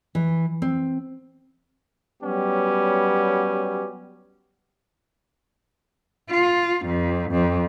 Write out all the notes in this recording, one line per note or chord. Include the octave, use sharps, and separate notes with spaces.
E3
C4
F#3 G3 B3 C#4 G4
F4
F2
F2